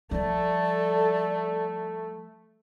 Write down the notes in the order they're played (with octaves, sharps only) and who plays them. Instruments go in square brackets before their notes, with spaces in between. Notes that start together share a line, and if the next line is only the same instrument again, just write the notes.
[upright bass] F3 G3 [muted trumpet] A3 [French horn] A4 [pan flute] D5